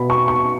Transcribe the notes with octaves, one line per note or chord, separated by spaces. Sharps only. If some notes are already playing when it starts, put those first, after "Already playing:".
Already playing: B2 B3 B5
C#6
C#6